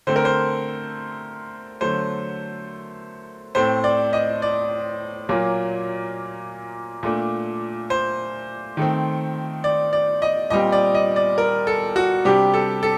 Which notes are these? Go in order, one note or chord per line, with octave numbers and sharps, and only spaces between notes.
D3 A3 C4 C5
A#4
C5
D3 F#3 A3 C5
A2 A3 C4 C5
D5
D#5
D5
A#2 F#3 A#3
A#2 A3 D4
C5
D#3 A3 C4
D5
D5
D#5
A#2 G3 C4 D#5
D5
D#5
D5
A#4
A4
F#4
C3 G3 D4 G4
A4
A4